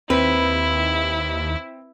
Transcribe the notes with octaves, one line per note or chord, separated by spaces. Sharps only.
D#2 C4 E4 B4